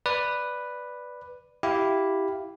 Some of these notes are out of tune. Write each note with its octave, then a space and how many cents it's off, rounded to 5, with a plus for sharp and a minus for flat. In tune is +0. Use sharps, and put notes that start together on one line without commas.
B4 +0 D5 +5
E4 +0 G4 -10 F5 +0